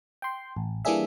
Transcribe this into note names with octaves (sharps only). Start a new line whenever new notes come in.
G5 C6
A1
E3 G3 A#3 D4 G#4 E5